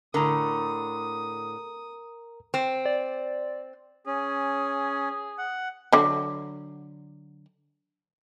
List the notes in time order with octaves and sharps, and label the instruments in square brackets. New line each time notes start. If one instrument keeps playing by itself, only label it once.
[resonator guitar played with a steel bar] A2 D3 [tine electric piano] A#4 A#5 [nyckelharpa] D#6
[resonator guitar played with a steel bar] C4
[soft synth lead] D5
[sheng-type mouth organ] C#4 [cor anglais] G#4
[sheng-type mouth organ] F#5
[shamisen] D3 F#3